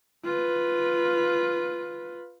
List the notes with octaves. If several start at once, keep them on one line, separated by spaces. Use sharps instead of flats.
F4 B4